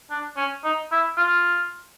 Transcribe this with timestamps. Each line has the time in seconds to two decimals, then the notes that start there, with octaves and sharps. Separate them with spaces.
0.10 D4
0.36 C#4
0.64 D#4
0.91 E4
1.17 F4